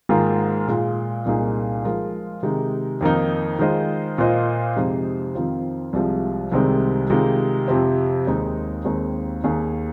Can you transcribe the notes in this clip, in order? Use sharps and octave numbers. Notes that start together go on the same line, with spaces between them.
G#2 D#3 A#3 F4 G#4
A#2 G#3 F4
C2 A#2 A#3 D#4 G#4
F3 G#3 F4 A#4
C3 D#3 G#3 D#4
F2 D#3 A#3 D#4
D#3 G#3 F4 C5 D#5
A#2 A#3 F4 C5 D#5
F2 C3 G#3 D#4 C5
F2 D#3 C4 F4
C2 C3 F3 G#3
C2 C3 D#3 G#3 C4
C3 D#3 G#3 F4
F2 C3 F3 C4
D#2 D#3 G#3 C4 D#4
D#2 D#3 G#3 C4
D#2 D#3 A#3 G#4